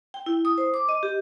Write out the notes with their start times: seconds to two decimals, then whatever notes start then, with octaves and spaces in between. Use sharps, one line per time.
0.14 G5
0.26 E4
0.45 D#6
0.58 C5
0.74 D6
0.89 D#5
1.03 G4